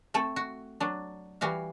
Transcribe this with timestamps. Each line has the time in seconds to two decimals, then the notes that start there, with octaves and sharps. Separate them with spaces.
0.14 A3 C4 A4
0.36 F#4
0.80 F#3 D4
1.41 E3 G3 F#4 F5